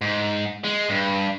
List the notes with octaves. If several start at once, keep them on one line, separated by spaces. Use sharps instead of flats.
G#2
G#3
G2